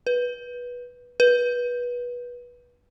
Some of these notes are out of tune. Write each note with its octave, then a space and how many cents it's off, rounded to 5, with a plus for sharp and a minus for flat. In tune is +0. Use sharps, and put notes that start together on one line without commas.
B4 -15
B4 -20